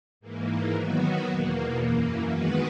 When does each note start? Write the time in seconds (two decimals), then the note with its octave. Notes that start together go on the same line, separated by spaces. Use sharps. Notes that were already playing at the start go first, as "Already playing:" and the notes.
0.21 G#2 E3 A#3
0.73 D#3 F#3 B3 F#4
1.25 E2 B2 A#3
1.78 F#2 E3 A#3
2.30 D#3 G#3 B3 F#4 B4